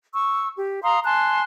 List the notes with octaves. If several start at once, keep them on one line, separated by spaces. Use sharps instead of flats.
C#6 E6
G4
F5 A#5 C6 D#6
G#5 A5 C6 F#6